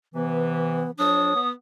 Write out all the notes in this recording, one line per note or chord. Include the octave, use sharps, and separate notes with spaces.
C3 E3 B3
F2 F#3 D4 C#5 D#6
B3